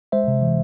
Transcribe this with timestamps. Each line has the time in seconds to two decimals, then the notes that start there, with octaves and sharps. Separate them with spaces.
0.12 G#3 C5 E5
0.28 C3
0.42 E3